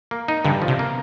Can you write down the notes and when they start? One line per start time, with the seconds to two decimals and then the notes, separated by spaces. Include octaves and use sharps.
0.11 A#3
0.28 D#4
0.45 G2 D3
0.62 F3
0.68 C3
0.79 A#3